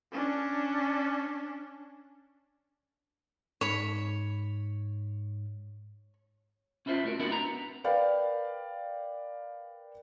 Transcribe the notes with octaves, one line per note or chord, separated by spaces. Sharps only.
C#4 D4
G#2 C#5 B5
C#4 E4 F4 C5 E5
A3 F#4 A#4
B3 C4 D4 E4 F#4
A#5
B3
A#4 B4 D5 F5 G5